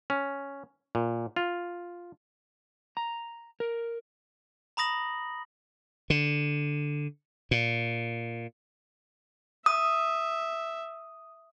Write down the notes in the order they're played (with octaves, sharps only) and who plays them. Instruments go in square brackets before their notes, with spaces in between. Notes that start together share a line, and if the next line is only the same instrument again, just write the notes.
[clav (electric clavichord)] C#4
A#2
F4
[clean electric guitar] A#5
A#4
[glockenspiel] A#5 B5 D#6 A#6 F#7
[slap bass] D3
A#2
[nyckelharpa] E5 [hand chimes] D#6